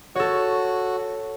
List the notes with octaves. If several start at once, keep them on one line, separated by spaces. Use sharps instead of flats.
F#4 A4 C#5